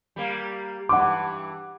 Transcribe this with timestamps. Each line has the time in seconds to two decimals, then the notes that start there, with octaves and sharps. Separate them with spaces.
0.16 G3 A#3
0.89 G2 E3 F#5 D6